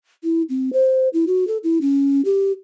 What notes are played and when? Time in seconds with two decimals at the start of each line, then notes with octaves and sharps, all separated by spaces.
0.24 E4
0.49 C4
0.73 C5
1.13 E4
1.27 F#4
1.47 A4
1.64 E4
1.81 C#4
2.25 G4